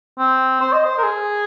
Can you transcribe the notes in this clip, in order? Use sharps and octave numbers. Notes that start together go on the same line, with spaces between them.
C4
C5
D#5
C5
A#4
G#4